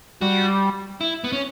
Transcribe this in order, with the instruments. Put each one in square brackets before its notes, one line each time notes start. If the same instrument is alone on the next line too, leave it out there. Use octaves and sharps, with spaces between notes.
[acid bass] G3 [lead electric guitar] F#4
[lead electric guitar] E4
B3
C#4